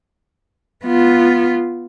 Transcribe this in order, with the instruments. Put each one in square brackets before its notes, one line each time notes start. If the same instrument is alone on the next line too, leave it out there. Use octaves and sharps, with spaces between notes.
[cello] B3 F4